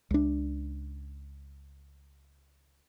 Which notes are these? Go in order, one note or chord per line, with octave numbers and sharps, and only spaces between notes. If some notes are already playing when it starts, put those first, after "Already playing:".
C#2 D4